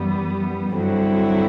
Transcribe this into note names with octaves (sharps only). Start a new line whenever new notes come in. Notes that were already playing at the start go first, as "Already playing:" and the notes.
Already playing: F#2 E3 G3 B3
G2 D3 F#3 C4 E4